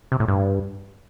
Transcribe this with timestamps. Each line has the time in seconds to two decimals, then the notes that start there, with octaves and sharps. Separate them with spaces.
0.12 C3
0.20 A2
0.28 G2